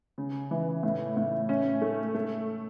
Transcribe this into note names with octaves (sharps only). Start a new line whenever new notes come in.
C#3
E3
A2
A2
C#4
A3
A3